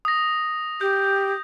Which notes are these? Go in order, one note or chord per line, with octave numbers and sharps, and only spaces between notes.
D#6 A#6
G4 G6